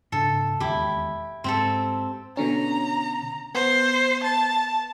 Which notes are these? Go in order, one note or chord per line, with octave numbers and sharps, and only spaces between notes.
G#2 C#3 D4 A4
E1 D#2 E4 G4
G#2 C4 G4 A4
B2 D3 C#4 A#5
B3 C5
A5